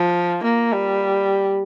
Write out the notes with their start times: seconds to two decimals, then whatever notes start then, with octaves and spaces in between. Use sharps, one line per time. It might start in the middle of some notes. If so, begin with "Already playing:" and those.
Already playing: F3
0.44 A#3
0.72 G3